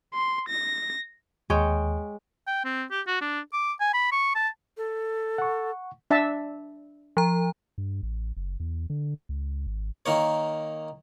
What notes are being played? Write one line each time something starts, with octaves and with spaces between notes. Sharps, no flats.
C6
A#6
D#2 G#3 C#5 G5
G5
C4
G4
F#4
D4
D6
G#5
B5
C#6
A5
A4
F#5 C#6
D4 E5 A5
F3 A#5
G2
A1
F#1
E2
D3
C#2
G#1
D#3 A#3 C#5